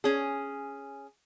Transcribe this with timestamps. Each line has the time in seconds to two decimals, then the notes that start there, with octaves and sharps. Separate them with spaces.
0.04 C#4 G#4